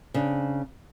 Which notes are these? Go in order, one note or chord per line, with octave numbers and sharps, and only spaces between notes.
C#3 C4 D4